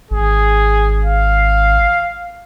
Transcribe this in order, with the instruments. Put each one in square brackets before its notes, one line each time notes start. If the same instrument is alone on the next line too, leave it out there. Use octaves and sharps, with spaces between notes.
[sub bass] G#1 [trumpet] G#4
[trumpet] F5